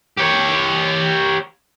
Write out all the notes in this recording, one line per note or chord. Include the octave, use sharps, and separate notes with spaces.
G4 C#5